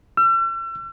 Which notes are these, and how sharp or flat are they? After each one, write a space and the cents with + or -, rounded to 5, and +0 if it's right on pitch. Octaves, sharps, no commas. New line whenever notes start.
E6 +40